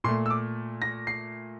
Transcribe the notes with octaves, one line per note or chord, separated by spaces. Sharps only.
A#2 A3 C6
E6
D6
A#6
C7